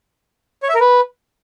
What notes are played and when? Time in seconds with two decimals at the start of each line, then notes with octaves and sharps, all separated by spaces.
0.63 C#5
0.69 E5
0.75 A#4
0.81 B4